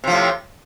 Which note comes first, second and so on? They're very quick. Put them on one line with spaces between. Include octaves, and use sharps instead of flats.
C3 F3 A2